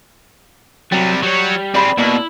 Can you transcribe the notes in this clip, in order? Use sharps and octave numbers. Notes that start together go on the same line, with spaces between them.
C3 F#3 G3
F#3 G3 C#5
C4 G#4 D5 B5
B2 A#3 E4 D5